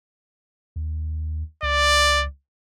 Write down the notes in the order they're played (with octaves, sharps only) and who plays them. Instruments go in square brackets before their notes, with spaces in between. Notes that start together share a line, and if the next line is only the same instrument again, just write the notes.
[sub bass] D#2
[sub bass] C#2 [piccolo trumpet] D5